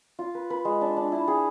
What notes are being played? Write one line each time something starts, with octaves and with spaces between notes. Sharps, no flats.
F4
B4
B4
G#3
D4
D4
E4
G#4